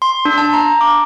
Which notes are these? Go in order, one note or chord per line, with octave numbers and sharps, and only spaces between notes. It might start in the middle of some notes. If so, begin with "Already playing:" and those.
C6
D4
A5
A#5
D6